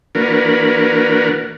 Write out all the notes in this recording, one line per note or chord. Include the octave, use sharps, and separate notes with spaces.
E3 A#3 D4 F#4 A#4 B4